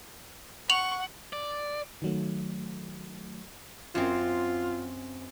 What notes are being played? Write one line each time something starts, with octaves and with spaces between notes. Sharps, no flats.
F#5 C#6 F7 F#7
D5
D#3 F#3 A3
F#2 C4 F4